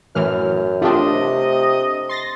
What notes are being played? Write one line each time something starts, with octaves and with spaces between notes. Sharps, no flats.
F#2 A2 E3 F6
A3 C4 D4 F4 G4 D#5
C3
C6 A6 A#6